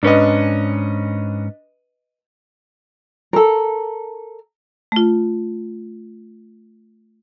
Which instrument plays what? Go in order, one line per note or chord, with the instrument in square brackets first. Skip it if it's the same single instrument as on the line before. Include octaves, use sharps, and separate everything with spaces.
[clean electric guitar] G#2 C#4 [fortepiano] D4 B4 D#5
[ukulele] A4 A#4
[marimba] A3 F4